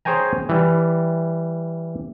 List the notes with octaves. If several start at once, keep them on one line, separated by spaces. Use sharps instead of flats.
G#4 C5 C#5 G5 G#5 A#5
E3 G3